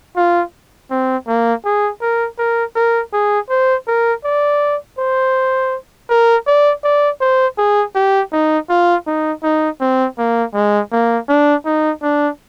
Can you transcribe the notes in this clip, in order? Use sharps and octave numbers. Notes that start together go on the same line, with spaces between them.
F4
C4
A#3
G#4
A#4
A#4
A#4
G#4
C5
A#4
D5
C5
A#4
D5
D5
C5
G#4
G4
D#4
F4
D#4
D#4
C4
A#3
G#3
A#3
D4
D#4
D4